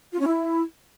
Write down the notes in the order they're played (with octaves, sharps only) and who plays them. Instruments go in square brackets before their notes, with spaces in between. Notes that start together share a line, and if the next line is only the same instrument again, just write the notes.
[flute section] F4
C#4
E4